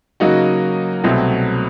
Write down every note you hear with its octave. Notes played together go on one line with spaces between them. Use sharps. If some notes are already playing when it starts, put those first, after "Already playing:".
C#3 F#3 A#3 D#4 F#4
C2 B2 F#3 A3 C4